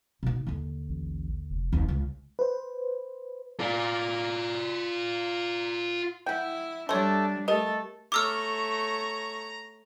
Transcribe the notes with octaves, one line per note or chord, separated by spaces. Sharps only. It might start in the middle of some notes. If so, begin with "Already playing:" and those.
B2 D#4
D#2 D3
A1
F1
D#2 C4
C#2
B4 C5
F4 D5
E4 F#5 G5
G3 A3 D4 C#5 C6
A3 G4 A4 A#4 D#5
A3 C#5 A#5 D6 E6 F6